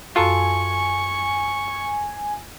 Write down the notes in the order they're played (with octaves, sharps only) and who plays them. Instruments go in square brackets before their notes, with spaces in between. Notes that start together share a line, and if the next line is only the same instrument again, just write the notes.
[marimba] F#2 F#4 [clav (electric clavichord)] F4 A4 [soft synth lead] G#5 [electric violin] C#6